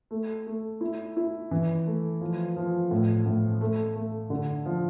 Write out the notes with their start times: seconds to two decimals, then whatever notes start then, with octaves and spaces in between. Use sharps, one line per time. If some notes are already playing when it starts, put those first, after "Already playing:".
0.11 A3
0.47 A3
0.81 E4
1.17 E4
1.51 E3
1.86 A3
2.21 F3
2.56 F3
2.91 A2
3.26 A2
3.61 A3
3.96 A3
4.30 D3
4.66 F3